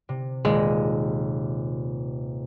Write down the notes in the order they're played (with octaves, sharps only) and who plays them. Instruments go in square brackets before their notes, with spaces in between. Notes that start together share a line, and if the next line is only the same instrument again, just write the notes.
[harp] C3
[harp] D#1 [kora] G#3